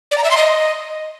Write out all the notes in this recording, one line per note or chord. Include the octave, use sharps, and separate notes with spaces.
D5
A#5
E5
C6
D#5